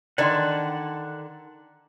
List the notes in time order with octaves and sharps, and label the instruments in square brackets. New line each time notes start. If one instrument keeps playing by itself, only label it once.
[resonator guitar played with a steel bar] D3 D#3 [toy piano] D5 D#5 C6 [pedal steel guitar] F#5 A5